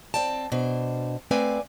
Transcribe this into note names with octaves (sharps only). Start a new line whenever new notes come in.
C4 D5 G5 A5
B2 D4 C5
A3 C4 B4 D5 F5 G#5